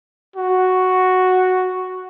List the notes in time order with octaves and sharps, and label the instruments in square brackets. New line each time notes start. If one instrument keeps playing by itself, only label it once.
[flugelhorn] F#4